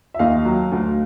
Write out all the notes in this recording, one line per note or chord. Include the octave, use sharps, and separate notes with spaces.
E5
D#2 D#5 F5
F#3
D2